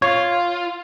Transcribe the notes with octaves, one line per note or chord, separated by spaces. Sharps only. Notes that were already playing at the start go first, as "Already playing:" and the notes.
F4 C#5